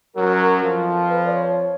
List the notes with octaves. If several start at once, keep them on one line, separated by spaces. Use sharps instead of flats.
F#2 F#3 A#4
F2 F3
B4
D5
C#5